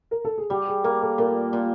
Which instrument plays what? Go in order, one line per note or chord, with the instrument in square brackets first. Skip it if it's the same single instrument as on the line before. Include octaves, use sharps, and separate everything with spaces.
[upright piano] A#4
A4
G#4
[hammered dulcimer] G3 [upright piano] G4
[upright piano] G#4
[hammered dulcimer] A#3 [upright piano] A#4
[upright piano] A4
[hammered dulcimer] A#2 [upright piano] A#4
[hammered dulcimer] A#2